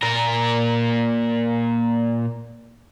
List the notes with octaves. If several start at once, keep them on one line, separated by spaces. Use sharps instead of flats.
A#2 A#4